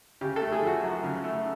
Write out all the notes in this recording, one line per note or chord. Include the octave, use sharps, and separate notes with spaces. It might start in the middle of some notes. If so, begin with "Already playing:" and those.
C#3 G4
A4
A3
G#4
F3 F#4
F#2
C#3
A3